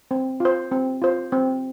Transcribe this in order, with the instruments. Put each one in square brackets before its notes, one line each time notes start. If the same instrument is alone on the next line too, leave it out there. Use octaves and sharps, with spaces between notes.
[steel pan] C4
F4 C5
C4
F4 C5
C4